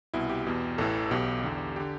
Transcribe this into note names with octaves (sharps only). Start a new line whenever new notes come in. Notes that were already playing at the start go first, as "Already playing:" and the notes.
C2 B2 E4
G4
E2 B2
A1 A2 E3 A4
B1 B2 G4
E2 D3
D3 G4